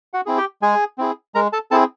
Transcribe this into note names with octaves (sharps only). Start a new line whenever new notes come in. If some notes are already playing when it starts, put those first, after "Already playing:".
F#4 F#5
C4 E4 G#4
G4 G5
G#3 G#4 G#5
C4 E4 G#4
G#3 A#4 A#5
A4 A5
C4 E4 G#4 A4 A5